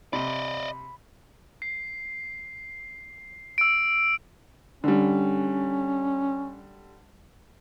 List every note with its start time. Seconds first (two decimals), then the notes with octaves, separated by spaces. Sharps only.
0.13 C3 D5 D#5 B5
1.62 C7
3.58 E6 D7
4.84 D3 G3 C#4